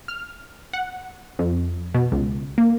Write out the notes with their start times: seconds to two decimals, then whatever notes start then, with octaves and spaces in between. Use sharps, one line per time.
0.08 F6
0.73 F#5
1.39 F2
1.94 B2
2.12 C#2
2.58 A#3